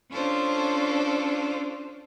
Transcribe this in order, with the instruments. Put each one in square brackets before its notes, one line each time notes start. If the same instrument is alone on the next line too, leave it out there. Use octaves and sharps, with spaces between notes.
[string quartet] C#4 D4 F4 A4 C5